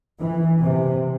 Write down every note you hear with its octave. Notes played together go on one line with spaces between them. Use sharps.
E3
C3